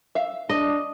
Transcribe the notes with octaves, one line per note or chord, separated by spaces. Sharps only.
E5 F5
D4 D#5